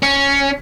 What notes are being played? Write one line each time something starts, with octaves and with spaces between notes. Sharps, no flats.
C#4